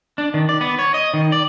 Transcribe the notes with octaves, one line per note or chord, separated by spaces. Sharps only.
D4
D#3
D5
B3
C#5
D#5
D#3
D5